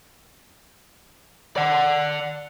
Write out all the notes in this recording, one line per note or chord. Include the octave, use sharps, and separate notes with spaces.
D5 F#5